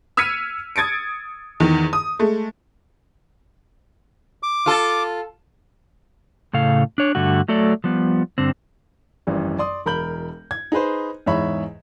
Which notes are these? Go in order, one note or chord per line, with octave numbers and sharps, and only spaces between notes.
E6 F6 G#6 B6 C#7 D#7
D#6 G#6 A6 C#7 D7
E2 D#3
D#6
G#3 A3
D6
F4 A4
A2 C#3 A4 F5
D4 C#5
G2 D3 A3 F#4
F#3 A3 A4 D5
F3 G3 B3
G2 D3 C4
G#1 F#2 E3 G3
D5 C6 D#6
E1 A#4 B5 G6 F#7
G#6
D#4 G#4 B4 C5
E2 G#2 C#5 E5 B5